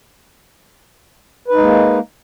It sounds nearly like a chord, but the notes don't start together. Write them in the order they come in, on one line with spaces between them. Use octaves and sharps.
B4 D#4 G#3 A#3